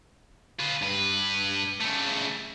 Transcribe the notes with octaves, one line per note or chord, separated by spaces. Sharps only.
F4 B4
G2 B4
C#3 A3